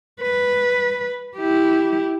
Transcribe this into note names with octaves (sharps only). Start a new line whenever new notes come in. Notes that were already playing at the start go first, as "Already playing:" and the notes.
B4
E4 G4